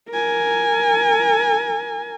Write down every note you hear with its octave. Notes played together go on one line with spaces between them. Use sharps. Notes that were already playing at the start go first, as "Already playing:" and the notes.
A#4 G#5